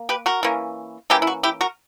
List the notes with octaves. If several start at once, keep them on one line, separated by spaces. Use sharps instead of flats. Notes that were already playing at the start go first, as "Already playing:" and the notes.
Already playing: A#3
G4 B4
F#4 A#4
E3 A#3 C#4
E3 A#3 C#4 E4 G4
E4
F#4
E4 G4
F#4 A#4